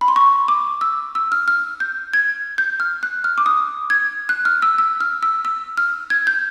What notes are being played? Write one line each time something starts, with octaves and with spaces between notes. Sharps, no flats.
B5
C6
C#6
D6
E6
E6
F6
F6
G6
G#6
G6
F6
F#6
F6
D6
D#6
G#6
F#6
F6
E6
E6
F6
E6
E6
F6
G#6
G6